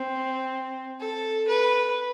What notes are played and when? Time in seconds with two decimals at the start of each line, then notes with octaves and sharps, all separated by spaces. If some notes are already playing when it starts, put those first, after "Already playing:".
Already playing: C4
1.00 A4
1.48 B4